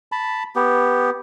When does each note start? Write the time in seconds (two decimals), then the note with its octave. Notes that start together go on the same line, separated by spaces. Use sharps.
0.12 A5 B5
0.56 B3 G4